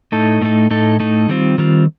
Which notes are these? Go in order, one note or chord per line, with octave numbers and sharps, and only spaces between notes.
A2 A3 D#4 A4
A2 A3 D#4 A4
A2 A3 D#4 A4
A2 A3 D#4 A4
D#3 G3 C4 F4
D#3 G3 C4 F4